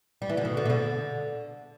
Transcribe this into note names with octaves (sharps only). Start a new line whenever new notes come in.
G3
E3
D3
B2
D3
B2
D3